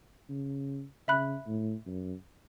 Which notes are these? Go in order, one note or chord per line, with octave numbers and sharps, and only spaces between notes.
C#3
C#3 E5 B5 F#6
A2
F#2